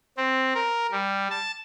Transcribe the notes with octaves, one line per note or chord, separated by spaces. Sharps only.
C4
A#4
G3
A5